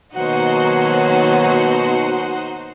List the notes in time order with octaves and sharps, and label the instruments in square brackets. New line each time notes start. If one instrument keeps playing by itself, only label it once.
[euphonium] B2 [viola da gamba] D#3 F#3 A#3 [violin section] D#4 F#4 C5 [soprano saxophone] F#5